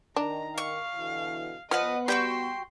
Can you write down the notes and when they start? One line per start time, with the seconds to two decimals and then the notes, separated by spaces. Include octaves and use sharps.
0.16 D#3 D4 A#5
0.58 F5 C#6
0.95 B2 D3 E3
1.71 F3 B3 B4 D#5 F#5 F6
2.08 G3 F#4 G5 C6 G6